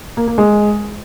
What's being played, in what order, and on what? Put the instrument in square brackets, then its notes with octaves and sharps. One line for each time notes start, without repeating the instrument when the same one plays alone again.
[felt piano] A#3
A#3
G#3